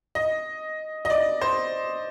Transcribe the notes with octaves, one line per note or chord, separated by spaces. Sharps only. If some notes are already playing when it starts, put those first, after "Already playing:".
D#5
D#5
D5
C5